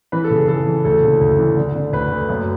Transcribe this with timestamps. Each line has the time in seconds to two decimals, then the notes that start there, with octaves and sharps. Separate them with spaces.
0.12 E3 B4
0.24 A4
0.30 C#3
0.36 G#4
0.48 E3 A4
0.67 E3
0.84 D2 A4
1.03 C#3
1.21 D2
1.39 E3
1.57 D3
1.75 D3
1.92 D2 B4
2.11 D2
2.29 F#2